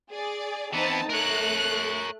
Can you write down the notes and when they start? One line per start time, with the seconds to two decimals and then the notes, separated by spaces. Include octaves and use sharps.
0.11 G#4 D5
0.73 E3 B3 C4 D#4 A5
1.09 A3 A#4 C#5 F#6